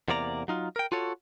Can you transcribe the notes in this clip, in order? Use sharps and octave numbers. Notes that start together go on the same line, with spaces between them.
E2 C3 A#3 D5 A#5
F#3 D#4 F4
A#4 G5
F4 F#4 A4 C#5